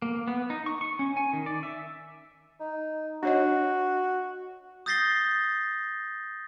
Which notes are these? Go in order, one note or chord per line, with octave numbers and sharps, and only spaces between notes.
A#3
B3
D#4
C#6
C#6
C#4
G#5
D#3
D5
E5
D#4
D4 F#4 C#5 D#5
D#6 G6 A6 A#6 C7 G7